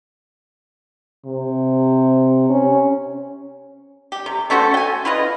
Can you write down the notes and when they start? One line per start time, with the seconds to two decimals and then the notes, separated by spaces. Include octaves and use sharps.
1.25 C3
2.49 C#4
4.12 G4
4.26 C3
4.50 A3 C#4 F#4 C5
4.74 G5 G#5
5.05 E4 F4 B4 D#5